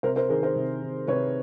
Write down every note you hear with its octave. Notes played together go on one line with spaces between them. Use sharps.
C3 A#4 C5
A#4 C5
D#3 G#4 A#4
A#4 C5
C3
D#3
C3 B4 C#5